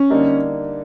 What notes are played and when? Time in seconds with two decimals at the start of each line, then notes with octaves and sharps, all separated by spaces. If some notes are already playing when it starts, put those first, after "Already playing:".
Already playing: C#4
0.10 D3 G3 A#3 D#4